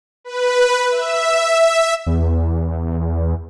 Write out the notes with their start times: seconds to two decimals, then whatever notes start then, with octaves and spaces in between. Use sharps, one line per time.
0.24 B4
0.91 E5
2.06 E2